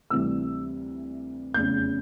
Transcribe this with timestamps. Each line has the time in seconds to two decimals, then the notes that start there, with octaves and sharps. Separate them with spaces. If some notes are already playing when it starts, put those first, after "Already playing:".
0.10 D2 C3 E3 G3 E6
1.54 F1 E2 C#3 G6